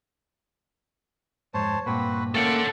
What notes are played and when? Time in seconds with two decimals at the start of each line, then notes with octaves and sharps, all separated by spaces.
1.54 F2 G#2 C5 C#5 A5
1.86 G2 A#2 C4 F#4 B4
2.35 A3 A#3 C#4 E4 F4 A4 F#5 G5